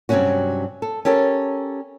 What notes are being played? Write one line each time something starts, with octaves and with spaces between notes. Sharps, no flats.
G2 C3 D#3 F#3 C#4 F#4
A4
C#4 G4 A4 A#4 C#5